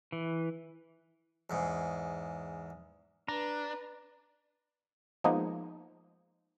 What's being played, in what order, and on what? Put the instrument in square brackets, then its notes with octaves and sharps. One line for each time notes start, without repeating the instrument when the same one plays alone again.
[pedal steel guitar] E3
[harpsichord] E2 G#2
[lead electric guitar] D4 [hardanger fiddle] B4 [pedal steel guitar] A#5
[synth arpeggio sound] F3 G#3 A#3 B3 D#4